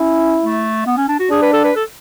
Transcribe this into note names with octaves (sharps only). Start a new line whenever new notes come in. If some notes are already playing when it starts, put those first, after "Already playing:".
Already playing: C#4 E4
A3
B3
C#4
D4
F#4
D4 G#4
B4
A4
B4
A4